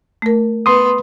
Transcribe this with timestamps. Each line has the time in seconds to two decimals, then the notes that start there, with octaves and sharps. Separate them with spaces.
0.22 A3 A#4
0.66 B3 C6 D#6